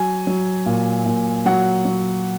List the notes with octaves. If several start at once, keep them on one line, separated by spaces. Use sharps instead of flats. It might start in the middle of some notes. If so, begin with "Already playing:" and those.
Already playing: F#3 G#5
F#3
A#2
A#2
F#3 F#5
F#3